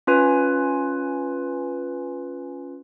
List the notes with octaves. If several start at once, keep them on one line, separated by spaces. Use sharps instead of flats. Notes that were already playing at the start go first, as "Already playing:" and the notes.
C#4 F4 B4 G#5